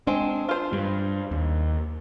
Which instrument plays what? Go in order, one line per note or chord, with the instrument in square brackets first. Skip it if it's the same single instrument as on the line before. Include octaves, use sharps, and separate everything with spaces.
[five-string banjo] G#3 C4 [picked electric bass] D4
[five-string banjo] F4 C5
[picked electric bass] G2
D#2